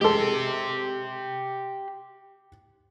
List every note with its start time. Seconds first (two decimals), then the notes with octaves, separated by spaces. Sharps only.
0.01 G#3 G4 A4 C6